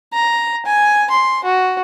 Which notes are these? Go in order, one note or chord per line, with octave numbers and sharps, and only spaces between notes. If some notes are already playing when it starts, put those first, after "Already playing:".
A#5
G#5
C6
F#4